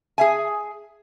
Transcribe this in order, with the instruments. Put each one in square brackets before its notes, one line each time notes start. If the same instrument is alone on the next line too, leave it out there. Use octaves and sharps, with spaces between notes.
[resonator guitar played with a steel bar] G#4 E5 G#5